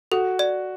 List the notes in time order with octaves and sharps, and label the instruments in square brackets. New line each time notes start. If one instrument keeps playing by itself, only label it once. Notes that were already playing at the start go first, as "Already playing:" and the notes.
[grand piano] F#4 [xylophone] A4
[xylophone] D5